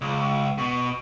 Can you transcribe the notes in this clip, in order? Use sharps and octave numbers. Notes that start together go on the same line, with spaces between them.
C#2
B2